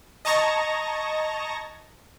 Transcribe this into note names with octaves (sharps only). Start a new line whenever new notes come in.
D#5 A5 A#5 C#6 G#6 A#6